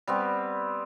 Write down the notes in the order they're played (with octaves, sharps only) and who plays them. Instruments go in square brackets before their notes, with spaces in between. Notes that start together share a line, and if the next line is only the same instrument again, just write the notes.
[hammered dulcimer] G3 B3 C4